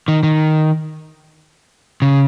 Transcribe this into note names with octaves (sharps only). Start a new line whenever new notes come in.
D#3
D#3
C#3